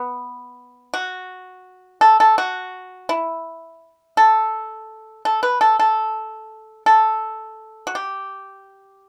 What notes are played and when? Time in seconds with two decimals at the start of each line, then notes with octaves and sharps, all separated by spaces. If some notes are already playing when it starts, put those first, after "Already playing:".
Already playing: B3
0.94 F#4
2.01 A4
2.20 A4
2.38 F#4
3.09 E4
4.17 A4
5.25 A4
5.43 B4
5.61 A4
5.79 A4
6.86 A4
7.87 F#4
7.95 G4